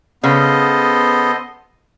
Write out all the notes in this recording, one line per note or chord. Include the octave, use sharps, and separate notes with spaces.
C#3 B3 A4 C5 D#5